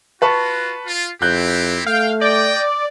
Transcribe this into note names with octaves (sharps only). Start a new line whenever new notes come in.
F4 F#4 B4 A5 C#6
F4
F2 C4 E4 G4 F#6 G6
A3 F5 G5
D5 D#5 G5